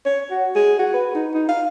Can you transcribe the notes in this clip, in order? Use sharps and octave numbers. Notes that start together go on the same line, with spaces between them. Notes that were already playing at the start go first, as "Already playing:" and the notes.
C#5
F#4
G#4
F#4
B4
D#4
D#4
F5